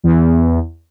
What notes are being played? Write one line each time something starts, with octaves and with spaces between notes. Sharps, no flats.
E2